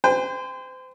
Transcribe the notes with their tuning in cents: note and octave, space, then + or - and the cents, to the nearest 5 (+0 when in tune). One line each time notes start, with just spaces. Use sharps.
C5 -35 G5 +30